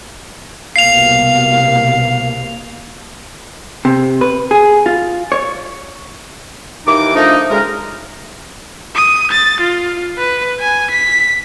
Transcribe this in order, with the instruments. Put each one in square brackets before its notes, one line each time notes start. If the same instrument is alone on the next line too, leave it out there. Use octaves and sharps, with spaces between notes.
[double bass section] C2 B2 A#3 [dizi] F5 [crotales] C7 F7
[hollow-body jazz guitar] C3
B4
G#4
F4
C#5
[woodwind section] D#2 E3 D#4 D6
F3 A3 D4 D#4
D2 C#3 G#3 D#4 A#4
[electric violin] D#6
A6
F4
B4
G#5
B6